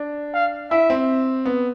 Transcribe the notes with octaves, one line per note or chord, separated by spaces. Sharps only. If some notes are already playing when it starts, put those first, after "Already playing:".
Already playing: D4
F5
E4 E5
C4
B3